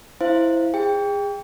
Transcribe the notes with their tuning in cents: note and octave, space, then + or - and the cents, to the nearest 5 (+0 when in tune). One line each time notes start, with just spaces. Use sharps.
E4 +0 C5 +0 F5 -20
G#4 -30 G5 +15